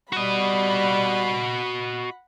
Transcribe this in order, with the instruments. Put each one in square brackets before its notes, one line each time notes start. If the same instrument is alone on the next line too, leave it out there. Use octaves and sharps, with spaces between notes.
[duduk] G3 [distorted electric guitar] F#4 D#5 [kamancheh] F#5 B5